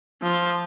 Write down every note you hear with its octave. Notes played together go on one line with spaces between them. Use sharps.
F3